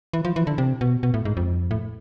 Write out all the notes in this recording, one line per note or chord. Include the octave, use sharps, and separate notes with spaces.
E3
F3
E3
D3
C3
B2
B2
A2
G#2
F2
A2